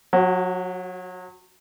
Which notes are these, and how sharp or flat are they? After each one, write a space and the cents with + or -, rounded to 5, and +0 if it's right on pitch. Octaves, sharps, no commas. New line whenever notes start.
F#3 -30 F#4 +20